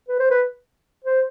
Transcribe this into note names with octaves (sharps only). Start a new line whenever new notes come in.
B4
C5
B4
C5